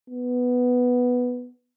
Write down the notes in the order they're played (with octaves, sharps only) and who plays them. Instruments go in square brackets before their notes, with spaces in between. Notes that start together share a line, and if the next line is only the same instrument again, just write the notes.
[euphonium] B3